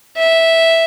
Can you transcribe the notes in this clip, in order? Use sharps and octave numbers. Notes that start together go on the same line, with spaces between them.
E5